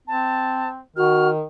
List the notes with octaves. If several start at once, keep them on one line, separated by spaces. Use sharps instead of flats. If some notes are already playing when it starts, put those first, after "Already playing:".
C4 A5
D#3 F#4 F6